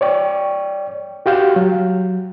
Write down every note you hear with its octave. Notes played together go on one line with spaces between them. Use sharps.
C#5 D5 G5 C#6
F#4 G4 F5 G6
F#3